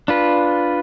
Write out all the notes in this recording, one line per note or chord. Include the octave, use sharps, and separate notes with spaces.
D4 F4 B4